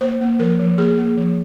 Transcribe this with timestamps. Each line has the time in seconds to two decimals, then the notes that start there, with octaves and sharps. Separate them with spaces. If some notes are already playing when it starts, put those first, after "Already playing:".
0.01 A#3 C5
0.21 A#3
0.39 F3 A#4
0.59 F3
0.78 A#3 G#4
0.97 A#3
1.17 F3